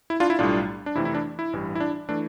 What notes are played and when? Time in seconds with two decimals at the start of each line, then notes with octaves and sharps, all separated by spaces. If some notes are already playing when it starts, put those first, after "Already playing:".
0.10 E4
0.20 D4 F4
0.30 E4
0.39 B1 A2 G3 D4 F4
0.86 D4
0.95 F2 C3 E3 A3 E4
1.05 E4
1.14 D4
1.39 E4
1.53 A1 G2 E3 G3
1.75 E4
1.80 D4
2.09 E3 A3 D4